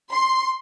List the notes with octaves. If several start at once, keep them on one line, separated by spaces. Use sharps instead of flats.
C6